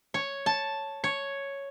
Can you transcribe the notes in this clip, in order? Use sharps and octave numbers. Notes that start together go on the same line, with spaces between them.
C#5
A5
C#5